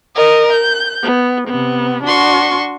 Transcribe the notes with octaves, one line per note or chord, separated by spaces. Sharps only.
A#4 D#5
G6
B3
C3 B3
D4 F#4 C6 C#6